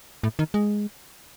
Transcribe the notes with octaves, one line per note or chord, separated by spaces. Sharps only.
A2
D#3
G#3